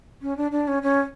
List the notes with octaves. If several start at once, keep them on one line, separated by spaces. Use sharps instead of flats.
C#4
D4
D4
C#4
C#4